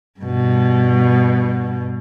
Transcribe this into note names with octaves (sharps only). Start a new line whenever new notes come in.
G2 B2